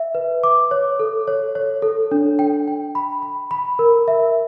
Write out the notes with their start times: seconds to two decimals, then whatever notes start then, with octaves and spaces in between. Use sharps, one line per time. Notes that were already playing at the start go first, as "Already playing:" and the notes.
Already playing: E5
0.15 B4
0.44 D6
0.71 C#5
1.00 A4
1.28 C#5
1.55 C#5
1.82 A4
2.11 D4
2.39 G5
2.68 G5
2.95 B5
3.22 B5
3.51 B5
3.79 A#4
4.08 E5